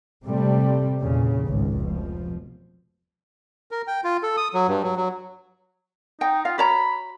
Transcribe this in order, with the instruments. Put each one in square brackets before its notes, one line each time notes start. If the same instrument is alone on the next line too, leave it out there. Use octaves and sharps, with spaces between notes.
[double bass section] C3 G3 A3 C4
E2 G2 A#2 C#3
G#1 C#2 A2
F1 B2 F3
[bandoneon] A#4
G5
F4
A4
D#6
F#3
G2
F#3
F#3
[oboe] D#4 [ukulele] G5
[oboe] F4 [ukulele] F5
[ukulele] F#4 C#5 A#5 [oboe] B5